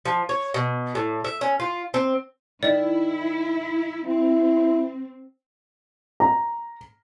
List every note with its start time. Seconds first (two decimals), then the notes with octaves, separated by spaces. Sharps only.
0.05 F3
0.29 C#5
0.54 B2
0.95 A2
1.25 E5
1.41 C#4
1.60 F4
1.94 C4
2.63 D#3 E4 D5
4.07 C4 E4
6.20 A#5